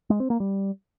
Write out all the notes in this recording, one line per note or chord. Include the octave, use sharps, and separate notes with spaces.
G#3
C4
A#3
G3